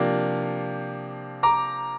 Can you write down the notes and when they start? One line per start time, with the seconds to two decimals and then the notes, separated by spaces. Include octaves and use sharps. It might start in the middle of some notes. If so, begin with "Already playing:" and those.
Already playing: C3 F3 A#3 D4
1.43 A#5 D6